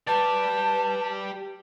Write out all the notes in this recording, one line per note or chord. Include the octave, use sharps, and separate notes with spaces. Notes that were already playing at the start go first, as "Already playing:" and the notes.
G4 B4 D5 A5